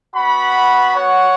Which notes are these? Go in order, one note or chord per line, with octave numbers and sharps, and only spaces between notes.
B3 F#4 F#5 B5
C#5 F#5